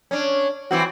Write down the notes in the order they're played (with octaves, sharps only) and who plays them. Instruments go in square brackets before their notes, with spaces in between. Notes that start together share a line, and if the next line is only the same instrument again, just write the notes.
[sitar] C#4 D4
E3 C4 F#4